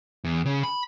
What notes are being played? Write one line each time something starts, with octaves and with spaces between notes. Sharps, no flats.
E2
C#3
B5